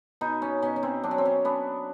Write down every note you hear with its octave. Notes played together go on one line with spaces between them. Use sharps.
B2 D#4
C#4
B2 C#4
C#4
C4
F#3 D4
C#4
C4
C#4
B3 D4